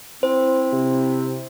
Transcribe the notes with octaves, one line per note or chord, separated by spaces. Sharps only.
C4 E4 C5
C3